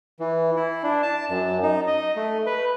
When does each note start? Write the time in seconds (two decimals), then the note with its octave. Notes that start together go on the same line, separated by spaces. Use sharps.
0.20 E3
0.56 E4
0.83 D4
1.03 A5
1.30 F#2
1.63 D#4
1.87 D#5
2.16 A3
2.46 B4